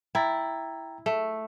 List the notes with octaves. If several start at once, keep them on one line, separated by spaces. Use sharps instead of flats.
E4 G5 A#5 A6
A3